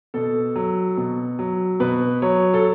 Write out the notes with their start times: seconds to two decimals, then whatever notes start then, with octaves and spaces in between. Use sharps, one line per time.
0.14 B2 A4
0.56 F#3
0.97 B2
1.39 F#3
1.80 B2 B4
2.22 F#3 C#5
2.54 A4